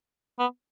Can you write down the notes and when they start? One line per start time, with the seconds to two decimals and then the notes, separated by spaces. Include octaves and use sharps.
0.39 B3